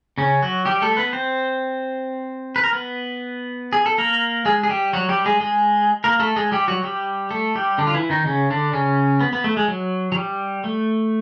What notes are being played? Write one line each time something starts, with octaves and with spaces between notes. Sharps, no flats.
C#3 C#4
F#3 F#4
G3 G4
A3 A4
B3 B4
C4 C5
B4
A#4
B3 B4
G#4
A4
A#3 A#4
G#3 G#4
G#4
G3 G4
F#3 F#4
G3 G4
G#3 G#4
G#3 G#4
A#3 A#4
A3 A4
G#3 G#4
G3 G4
F#3 F#4
G3 G4
A3 A4
G3 G4
D3 D4
F4
E3 E4
D#3 D#4
C#3 C#4
D3 D4
C#3 C#4
B3
B3
A3
G#3
F#3
F#3
G3
A3